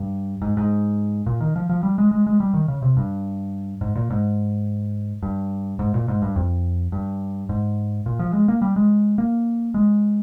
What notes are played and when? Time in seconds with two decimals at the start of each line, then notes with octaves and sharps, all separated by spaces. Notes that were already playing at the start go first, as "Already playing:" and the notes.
Already playing: G2
0.42 G#2
0.57 G#2
1.26 A#2
1.41 D#3
1.56 F3
1.69 F3
1.83 G3
1.98 G#3
2.11 G#3
2.27 G#3
2.40 G3
2.54 D#3
2.68 C#3
2.82 C3
2.97 G2
3.81 G#2
3.95 A#2
4.10 G#2
5.23 G2
5.79 G#2
5.94 A#2
6.08 G#2
6.22 G2
6.36 F2
6.92 G2
7.49 G#2
8.06 A#2
8.19 F3
8.33 G#3
8.48 A#3
8.62 G3
8.76 G#3
9.18 A#3
9.74 G#3